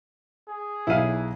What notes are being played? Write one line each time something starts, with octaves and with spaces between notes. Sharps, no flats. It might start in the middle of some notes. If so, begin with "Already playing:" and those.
G#4
B1 D#4 E4 F5 D#7